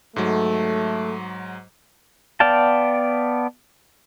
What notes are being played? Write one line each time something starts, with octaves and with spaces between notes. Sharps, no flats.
G#2 F#3 A3
B3 D5 F5 G5 A5